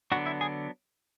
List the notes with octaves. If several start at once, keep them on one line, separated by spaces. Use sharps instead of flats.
D3 F#3 B3 D4 F#4 F#5
E4 E5
G#4 G#5